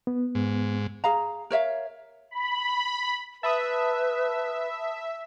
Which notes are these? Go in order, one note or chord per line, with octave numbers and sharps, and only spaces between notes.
B3
G#2
G#4 F5 A#5
A#4 C#5 E5 F5
B5
B4 E5 A5 B5 D#6